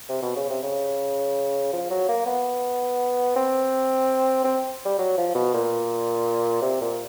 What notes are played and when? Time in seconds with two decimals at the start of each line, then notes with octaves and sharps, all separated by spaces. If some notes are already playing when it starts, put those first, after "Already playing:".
0.09 C3
0.22 B2
0.36 C#3
0.50 C3
0.63 C#3
1.73 F3
1.91 F#3
2.08 A#3
2.26 B3
3.36 C4
4.44 C4
4.85 G3
4.98 F#3
5.18 F3
5.35 B2
5.54 A#2
6.62 C3
6.81 A#2